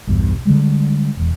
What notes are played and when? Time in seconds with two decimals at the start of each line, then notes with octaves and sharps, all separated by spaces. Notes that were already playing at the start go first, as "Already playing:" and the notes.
0.07 B1 E2 G2 B2
0.45 D3 G3 G#3
1.17 E1